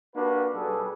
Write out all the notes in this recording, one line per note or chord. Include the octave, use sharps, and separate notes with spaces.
A#3 D4 F#4 G4 B4
B1 B2 G3 G#4 A4 B4